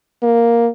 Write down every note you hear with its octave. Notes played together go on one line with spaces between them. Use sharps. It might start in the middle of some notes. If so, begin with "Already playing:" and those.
A#3